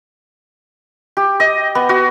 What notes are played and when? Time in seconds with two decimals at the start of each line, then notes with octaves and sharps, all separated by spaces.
1.17 G4
1.40 D#5
1.75 B3
1.89 F#4